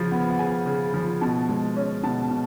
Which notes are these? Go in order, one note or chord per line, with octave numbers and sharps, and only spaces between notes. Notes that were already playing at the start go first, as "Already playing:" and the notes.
Already playing: C#3 F3
B3
F#5
C#3 G#5
C#3
F3
B2 A5
G#3
C#4
B2 A5
B2